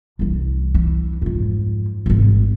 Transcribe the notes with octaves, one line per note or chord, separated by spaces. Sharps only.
C2 E3
E3
F2 G#2
D1 G#1